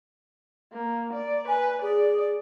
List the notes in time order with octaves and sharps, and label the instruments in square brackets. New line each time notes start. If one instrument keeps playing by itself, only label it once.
[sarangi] A#3
D5
[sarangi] B4 [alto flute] G#5
[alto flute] G#4 [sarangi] D5